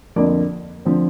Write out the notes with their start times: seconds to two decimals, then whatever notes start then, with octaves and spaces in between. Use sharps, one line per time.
0.16 F2 D3 F3 A#3 D5
0.85 D3 F3 C4